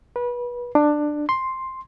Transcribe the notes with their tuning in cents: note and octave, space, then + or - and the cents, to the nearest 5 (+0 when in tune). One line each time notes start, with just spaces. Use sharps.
B4 -25
D4 +15
C6 +5